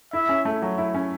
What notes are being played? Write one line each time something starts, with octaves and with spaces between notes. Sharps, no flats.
E4 E5
C#4
A3
F#3
E4
C#4